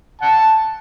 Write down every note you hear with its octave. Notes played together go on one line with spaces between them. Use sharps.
F#5 A5